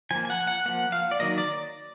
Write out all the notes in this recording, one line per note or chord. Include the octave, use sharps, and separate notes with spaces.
F3 A#3 G#5
G#5
F#5
F#5
F3 A#3 F#5
F5
D5
D#3 F#3 A#3 D#5
D5